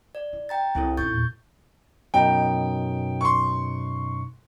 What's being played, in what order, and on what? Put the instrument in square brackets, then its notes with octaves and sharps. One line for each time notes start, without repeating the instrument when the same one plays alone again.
[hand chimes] D5
[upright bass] E4
[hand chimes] G5 A#5 A6
[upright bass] C2 [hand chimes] C4 E4 A4
[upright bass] F#2 D#4 [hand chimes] C#6 G6 A6
[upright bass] E2 A#2
[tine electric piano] F#2 B2 D#4 [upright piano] G5
[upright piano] C6 C#6